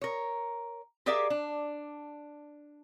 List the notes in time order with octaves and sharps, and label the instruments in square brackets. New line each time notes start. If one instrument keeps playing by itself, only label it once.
[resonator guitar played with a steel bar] A#4 C#5
G4 G#4 A#4 D5 E5 F5
D4